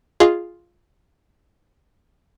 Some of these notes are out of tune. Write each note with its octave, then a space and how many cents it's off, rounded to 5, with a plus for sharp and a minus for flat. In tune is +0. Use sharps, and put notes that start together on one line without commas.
F4 +0 G#4 +0 D#5 +0